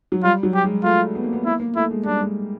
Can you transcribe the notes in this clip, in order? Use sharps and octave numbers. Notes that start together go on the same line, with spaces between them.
F#3
G3 F4
F#3
G4
G#3
A3 F4
B3
A#3
B3
A#3 E4
A#3
A3 E4
G#3
G3 D4
G#3